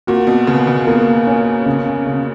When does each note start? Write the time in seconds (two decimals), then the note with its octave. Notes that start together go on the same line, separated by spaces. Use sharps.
0.07 A#2 F#4
0.27 B2
0.47 C#3 B3
0.67 C#3
0.87 B2 A#3
1.27 C#4
1.66 C#3
2.07 C#3